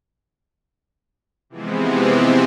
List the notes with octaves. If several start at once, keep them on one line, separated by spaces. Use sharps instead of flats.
C3 E3 F3 G#3 B3 C4